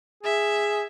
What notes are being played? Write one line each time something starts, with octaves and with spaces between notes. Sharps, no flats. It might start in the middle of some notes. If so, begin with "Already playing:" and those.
G#4 E5